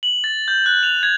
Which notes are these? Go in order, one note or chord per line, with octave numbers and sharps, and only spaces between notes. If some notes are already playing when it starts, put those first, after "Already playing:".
F#7
A6
G6
F#6
F7
G#6